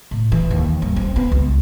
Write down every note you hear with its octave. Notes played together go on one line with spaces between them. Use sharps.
A2
E3
D#2
G2
C4
B3
C#2